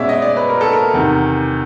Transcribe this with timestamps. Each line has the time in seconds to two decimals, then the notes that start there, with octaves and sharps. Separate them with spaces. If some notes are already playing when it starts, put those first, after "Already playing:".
Already playing: B2 G#3 C#4 D5 E5
0.09 D#5
0.22 D5
0.37 B4
0.49 A#4
0.61 A4
0.73 A#4
0.94 E2 C3 D#3